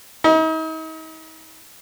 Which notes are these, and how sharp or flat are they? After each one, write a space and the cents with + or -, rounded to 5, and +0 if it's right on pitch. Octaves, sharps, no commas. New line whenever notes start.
D#4 +40